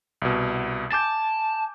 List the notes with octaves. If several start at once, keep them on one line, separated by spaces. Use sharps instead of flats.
C2 B2
G#5 A5 D6 G6